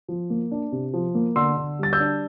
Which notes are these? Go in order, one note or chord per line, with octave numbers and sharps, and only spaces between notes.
F3
A#3
D4
C3
F3
A#3
D3 C6 E6
D3
G3 A6
E6 G6
D4